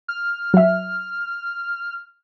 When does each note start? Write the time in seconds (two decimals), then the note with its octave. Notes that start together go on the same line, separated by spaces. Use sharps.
0.08 F6
0.54 F#3 E5